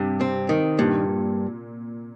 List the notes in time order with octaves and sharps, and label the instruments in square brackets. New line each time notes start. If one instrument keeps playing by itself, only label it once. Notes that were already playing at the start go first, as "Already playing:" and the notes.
Already playing: [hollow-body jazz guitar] G2 [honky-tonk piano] C3
[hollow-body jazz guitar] C4
D#3
[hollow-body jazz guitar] G2 [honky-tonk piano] A#2